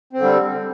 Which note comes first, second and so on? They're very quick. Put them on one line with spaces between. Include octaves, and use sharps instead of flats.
C4 D3 G3